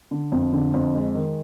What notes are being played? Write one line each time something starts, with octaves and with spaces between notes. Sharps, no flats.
D3
F2
D3
F2
G#3
D#3